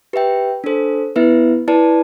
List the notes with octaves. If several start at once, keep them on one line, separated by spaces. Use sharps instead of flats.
G4 B4 E5 G5
D4 A4 C5
B3 E4 B4 E5
E4 B4 D5 A5